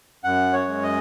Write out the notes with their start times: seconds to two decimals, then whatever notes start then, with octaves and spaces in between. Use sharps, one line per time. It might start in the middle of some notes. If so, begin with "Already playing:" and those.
0.24 F#2 F#5
0.53 C#5
0.68 G#3
0.83 D#5